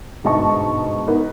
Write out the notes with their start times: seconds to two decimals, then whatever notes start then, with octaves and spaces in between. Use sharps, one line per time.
0.24 G1 G#2 B2 D#5 A5 C#6
1.07 B3 D#4 A#4